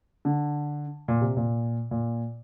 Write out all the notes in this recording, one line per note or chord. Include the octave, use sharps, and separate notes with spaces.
D3
A#2
C3
A#2
A#2